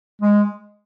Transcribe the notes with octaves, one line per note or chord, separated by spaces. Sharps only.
G#3